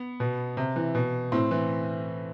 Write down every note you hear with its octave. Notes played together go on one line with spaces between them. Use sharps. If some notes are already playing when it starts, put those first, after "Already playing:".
Already playing: B3
B2
C3
E3
B2
A2 C4
E3